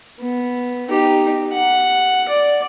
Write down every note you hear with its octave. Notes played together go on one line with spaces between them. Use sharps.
B3
D#4 G4
F#5
D5